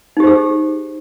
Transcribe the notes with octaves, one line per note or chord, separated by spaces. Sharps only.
D#4 G4 G#4 C5